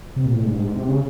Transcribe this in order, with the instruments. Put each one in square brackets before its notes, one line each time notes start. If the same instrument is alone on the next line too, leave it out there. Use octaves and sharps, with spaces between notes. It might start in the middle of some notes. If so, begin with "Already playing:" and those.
[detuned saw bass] C3
A#2
A2
G#2
G2
G#2
C3
C#3